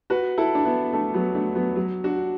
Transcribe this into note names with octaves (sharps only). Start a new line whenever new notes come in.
F#4 B4
E4 A4
D4
B3 E4
A3 D4
F#3 B3
A3 D4
F#3 B3
F#3
D4 F#4